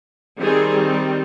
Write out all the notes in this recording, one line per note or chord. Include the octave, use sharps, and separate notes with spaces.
D#3 G3 C4 G#4